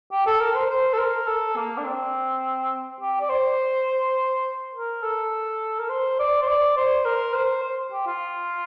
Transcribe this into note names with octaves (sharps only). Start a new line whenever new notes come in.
G4
A4
A#4
C5
C5
A4
A#4
A4
A#3
D4
C4
G4
D5
C5
A#4
A4
A#4
C5
D5
C5
D5
C5
A#4
C5
C5
G4
F4